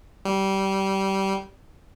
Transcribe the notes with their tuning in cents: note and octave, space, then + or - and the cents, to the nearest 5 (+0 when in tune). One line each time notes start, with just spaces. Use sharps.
G3 -20